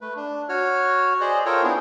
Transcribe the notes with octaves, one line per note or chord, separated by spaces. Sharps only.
A3 B4
D4
F#4 C#5 F6
G#4 C5 D5 D#5
F4 A4 A#4 C5 C#5 G5
B3 C4 D4 E4 G#4